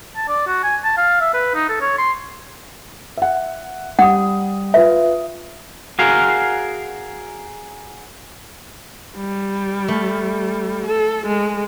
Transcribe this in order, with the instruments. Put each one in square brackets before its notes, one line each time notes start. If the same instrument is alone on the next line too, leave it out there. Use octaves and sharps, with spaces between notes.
[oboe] A5
D5
F#4
G#5
A5
F5
E5
B4
D#4
A4
C#5
C6
[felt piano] E5 F#5
[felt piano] G3 D#6 [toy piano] F#5
[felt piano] F4 B4 [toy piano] E5
[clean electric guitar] F#4 G#4 A#4 F5
[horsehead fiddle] G3
[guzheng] A3
[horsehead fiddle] A4
G#3